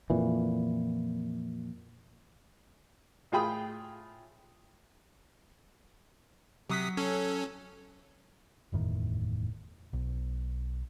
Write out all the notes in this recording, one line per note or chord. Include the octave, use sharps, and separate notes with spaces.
F2 A#2 E3
A2 F4 G#4 G5 B5 D#6
C3 F#3 D#6 B6
C#4 A4 C#5
F#1 E2 A2 D#3
B1